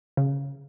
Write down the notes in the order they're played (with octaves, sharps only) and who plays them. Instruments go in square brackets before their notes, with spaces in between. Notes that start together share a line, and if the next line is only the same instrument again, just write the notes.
[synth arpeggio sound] C#3